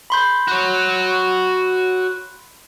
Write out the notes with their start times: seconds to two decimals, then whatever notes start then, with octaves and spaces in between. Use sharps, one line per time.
0.10 B5 C6 G6
0.48 F#4 C#5